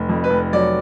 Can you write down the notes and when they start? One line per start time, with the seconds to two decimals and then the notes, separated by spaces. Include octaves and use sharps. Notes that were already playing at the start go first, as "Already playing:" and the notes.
Already playing: F1
0.09 F2
0.24 B4
0.30 F1
0.53 F#3 D5